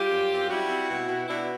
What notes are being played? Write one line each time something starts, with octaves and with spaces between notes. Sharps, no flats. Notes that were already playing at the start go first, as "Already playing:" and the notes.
Already playing: G3 F4 G4
F#2
C4
G3 E4 F#4
C4
B2
B2
B2 D4 E4